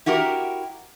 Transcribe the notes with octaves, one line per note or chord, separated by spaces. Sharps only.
E4 F#4 G4 A#4